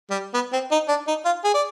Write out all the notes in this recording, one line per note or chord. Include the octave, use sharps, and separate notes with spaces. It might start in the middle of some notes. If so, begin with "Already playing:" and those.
G3
B3
C4
D#4
D4
D#4
F4
G#4
D5